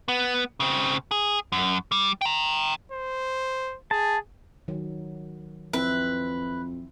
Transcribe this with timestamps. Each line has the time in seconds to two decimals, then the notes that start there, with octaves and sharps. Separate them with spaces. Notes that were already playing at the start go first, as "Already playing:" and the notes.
0.08 B3
0.60 C#3 C4
1.11 G#4
1.52 F#2
1.92 G3
2.21 G5 A#5
2.92 C5
3.91 G#4 A5
4.68 D#3 F#3
5.73 F2 C4 E4 B4 E5